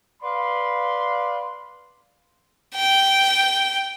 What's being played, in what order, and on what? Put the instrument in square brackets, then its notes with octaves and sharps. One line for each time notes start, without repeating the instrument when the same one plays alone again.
[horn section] B4 D5 F5 B5 C6
[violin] G5